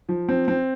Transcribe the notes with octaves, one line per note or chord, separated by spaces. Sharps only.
F3
C4
C4